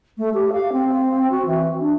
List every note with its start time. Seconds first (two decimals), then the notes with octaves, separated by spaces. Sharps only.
0.18 A3
0.34 G4
0.53 F5
0.72 C4
1.30 F#4
1.46 E3
1.80 D4